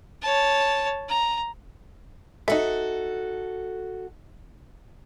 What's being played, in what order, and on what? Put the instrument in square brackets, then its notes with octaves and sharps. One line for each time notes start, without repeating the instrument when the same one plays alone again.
[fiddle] C#5 A5
A#5
[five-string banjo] D#4 E5 [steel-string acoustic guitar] F#4 A4